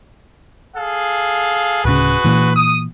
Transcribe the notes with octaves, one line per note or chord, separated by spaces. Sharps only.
G#4 A4 F5
D1 C#3 F#4 G#4 B4
A#2 E3
D#6